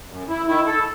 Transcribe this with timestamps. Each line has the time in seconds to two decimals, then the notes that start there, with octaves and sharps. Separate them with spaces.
0.10 F#2
0.29 E4
0.47 D#3 E4
0.66 A4